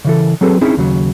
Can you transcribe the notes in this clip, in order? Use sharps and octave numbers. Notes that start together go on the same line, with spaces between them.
C#3 E3 A4
F#3 C4 G#4 A4 B4
C4 C#4 D#4 E4 G#4 E5
D#2 C#3 F#3